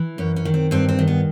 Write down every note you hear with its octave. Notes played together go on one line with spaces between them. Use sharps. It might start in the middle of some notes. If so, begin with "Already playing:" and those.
Already playing: E3
F#2 C#4
C#4
D#3
C4
G2 C4
C4
D#3
B3